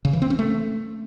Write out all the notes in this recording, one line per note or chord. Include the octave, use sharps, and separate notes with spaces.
C#3
E3
C4
C#4
A3